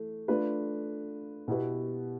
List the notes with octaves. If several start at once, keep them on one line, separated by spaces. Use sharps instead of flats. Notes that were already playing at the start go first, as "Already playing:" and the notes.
Already playing: E3 A3
A3 D4 F4 B4
B2 B3 E4 G4 B4